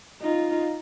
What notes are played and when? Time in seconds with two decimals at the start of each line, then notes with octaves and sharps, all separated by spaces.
0.21 D#4 F4